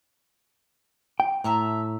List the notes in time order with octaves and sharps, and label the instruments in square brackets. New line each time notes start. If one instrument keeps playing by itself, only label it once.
[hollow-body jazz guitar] G5
[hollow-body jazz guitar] A2 [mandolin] E5 A5 A#5